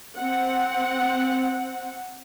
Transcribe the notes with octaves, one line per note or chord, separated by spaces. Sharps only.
C4 F#5